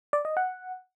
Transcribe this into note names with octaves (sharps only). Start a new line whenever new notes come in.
D5
D#5
F#5